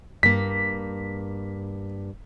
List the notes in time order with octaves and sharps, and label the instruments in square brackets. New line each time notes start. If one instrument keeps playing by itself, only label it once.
[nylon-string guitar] G2 A#3 [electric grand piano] B6